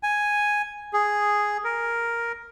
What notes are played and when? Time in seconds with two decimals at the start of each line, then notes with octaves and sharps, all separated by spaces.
0.03 G#5
0.93 G#4
1.64 A#4